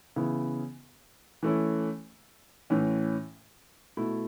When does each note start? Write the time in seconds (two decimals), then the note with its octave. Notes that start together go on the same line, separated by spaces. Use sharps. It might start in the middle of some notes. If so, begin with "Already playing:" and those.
0.16 C#3 E3 B3 E4
1.43 E3 A3 C#4 E4
2.70 A2 E3 C#4
3.97 B2 A3 E4